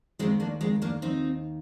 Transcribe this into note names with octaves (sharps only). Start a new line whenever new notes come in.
D#2 D#3 G#3 C4
A#3 D4
G#3 C4
A#3 D4
C4 D#4